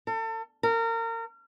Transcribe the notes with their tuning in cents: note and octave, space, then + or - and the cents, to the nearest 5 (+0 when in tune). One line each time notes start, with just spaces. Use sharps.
A4 +35
A#4 -30